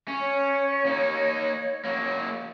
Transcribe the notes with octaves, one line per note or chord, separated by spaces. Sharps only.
C#4
C#5
A#3 D#4
F#3 A#3